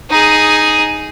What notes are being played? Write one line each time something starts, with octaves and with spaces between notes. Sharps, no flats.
D#4 G#4